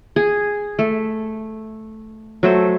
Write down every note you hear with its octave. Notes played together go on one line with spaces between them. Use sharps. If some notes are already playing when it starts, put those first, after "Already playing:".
G#4
A3
F#3 A3 C5